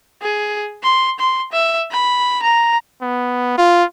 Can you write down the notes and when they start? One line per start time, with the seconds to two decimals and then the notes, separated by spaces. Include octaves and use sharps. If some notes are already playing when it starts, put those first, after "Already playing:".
0.22 G#4
0.83 C6
1.19 C6
1.52 E5
1.91 B5
2.42 A#5
3.02 B3
3.58 F4